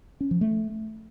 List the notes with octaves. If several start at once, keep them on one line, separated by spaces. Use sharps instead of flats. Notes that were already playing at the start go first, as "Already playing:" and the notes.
C#4
F3
A3